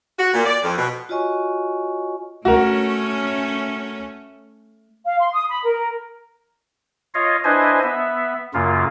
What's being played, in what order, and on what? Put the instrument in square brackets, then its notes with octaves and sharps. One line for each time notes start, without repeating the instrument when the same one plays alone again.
[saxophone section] F#4
A#2
D5
F2
B2
[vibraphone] F4 F#4 C#5 D#5 G#5 C#6
[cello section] A3 C#4 [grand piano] F#4 A#4
[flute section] F5
C6
D#6
B5
A#4
[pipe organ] F4 C#5 D#5 F5
D4 E4 B4 C5 D#5 G#5
B3 E5
F#2 C#3 A#3 F4